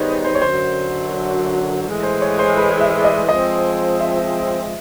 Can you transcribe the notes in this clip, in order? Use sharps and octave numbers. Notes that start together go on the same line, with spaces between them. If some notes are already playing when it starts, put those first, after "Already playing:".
Already playing: D#3 G3 B3 D#4 G#4 C5 C#5
C5
C#5
F#2 D3 F#3 C5
A2 E3 G#3
C5
C#5
C5
B4
E5
D5
D#5
F3 G#3 C4 D#5
E5